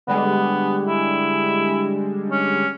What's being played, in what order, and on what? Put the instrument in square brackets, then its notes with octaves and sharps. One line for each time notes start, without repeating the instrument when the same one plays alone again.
[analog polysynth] D3 G3 G#3 [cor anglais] B3
[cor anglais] E4
C#4